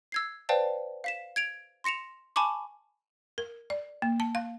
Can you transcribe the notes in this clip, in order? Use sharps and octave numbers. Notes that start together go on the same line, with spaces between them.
E6 G#6 C7
B4 C5 D5 F5 G5 A5
F5 B6 E7
G#6 D7 F7
C6 A#6 C#7 E7 F7
G#5 A5 B5 C#6 D6
A#4
D5
A#3
A5
F5